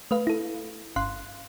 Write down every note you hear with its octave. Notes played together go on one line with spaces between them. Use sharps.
A3 B4 F5
E4 A4
G1 F5 C6 F#6